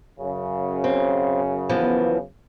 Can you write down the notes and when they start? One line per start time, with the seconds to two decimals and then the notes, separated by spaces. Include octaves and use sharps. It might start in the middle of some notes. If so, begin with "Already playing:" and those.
0.20 F#2 C#3
0.84 C4
1.69 E3 F3 B3